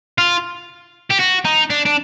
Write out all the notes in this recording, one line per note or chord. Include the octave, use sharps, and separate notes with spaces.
F4
G4
F#4
D#4
D4
D4